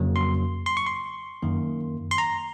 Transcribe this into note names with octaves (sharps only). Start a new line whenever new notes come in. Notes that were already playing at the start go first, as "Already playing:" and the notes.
Already playing: F2 C#3 F#3 A#3
C6
C6
C#6
C6
F#2 D#3 A#3
C6
A#5